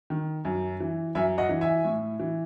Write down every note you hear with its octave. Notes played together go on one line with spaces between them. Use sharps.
D#3
F#2
E3
F#2 E5 G#5
D#5 F#5
E3
E5 G#5
A2
E3